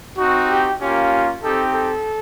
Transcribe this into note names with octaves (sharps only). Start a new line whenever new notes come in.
C4 D#4 F#4
G4
A#3 C#4 F4 G4
C4 D#4 G4 A4
A4